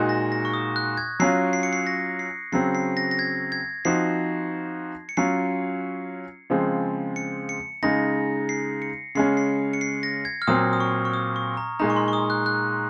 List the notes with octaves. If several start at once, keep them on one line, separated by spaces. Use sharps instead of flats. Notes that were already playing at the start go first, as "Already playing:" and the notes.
Already playing: A#2 G#3 D#4 F#4
A#6
A#6
C#6
D#6
F#6
G#6
F#3 C#4 F4 C7
C7
C#7
C7
A#6
C7
C#3 F#3 C4 C7
C7
A#6
A#6
G#6
G#6
F3 C4 D#4 F#4 C7
C#7
F#3 C#4 F4 C7
C#3 F3 G#3 C4
C#7
C#7
C#3 G#3 D#4 A#6
C7
C#7
C#3 G#3 C#4 C7
C7
C#7
C7
A#6
G#6
F6
A#2 F#3 C4 D#6
D#6
C#6
C#6
D#6
C#6
A#5
A#2 G#3 D#4 A#5
C#6
C6
C#6
D#6
F#6
F#6